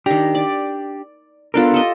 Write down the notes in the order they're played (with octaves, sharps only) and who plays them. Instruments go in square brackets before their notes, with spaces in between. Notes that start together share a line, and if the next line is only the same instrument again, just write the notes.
[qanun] D#3 A#5 [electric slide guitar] D4 G4
[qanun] D5
[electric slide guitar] B3 D4 A#4 [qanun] F4 A4 G5
[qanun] G4 A4 D#5